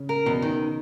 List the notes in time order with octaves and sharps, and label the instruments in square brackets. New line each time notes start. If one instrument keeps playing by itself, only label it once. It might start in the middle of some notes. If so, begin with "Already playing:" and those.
Already playing: [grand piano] C#3 C#4
[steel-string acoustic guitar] A#4
[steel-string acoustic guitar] E2 [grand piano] B2 B3
[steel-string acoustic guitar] D#3